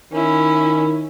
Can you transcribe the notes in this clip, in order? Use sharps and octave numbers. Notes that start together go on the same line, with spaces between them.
D#3 C#4 E4